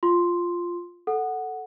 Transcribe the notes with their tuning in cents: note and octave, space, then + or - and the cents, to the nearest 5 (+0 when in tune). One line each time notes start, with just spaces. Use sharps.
F4 +0 C6 +0
A4 +0 F#5 +0